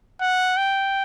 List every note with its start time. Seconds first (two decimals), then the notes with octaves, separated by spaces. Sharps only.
0.21 F#5
0.57 G5